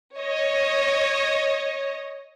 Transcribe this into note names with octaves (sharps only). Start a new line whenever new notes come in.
C#5 D#5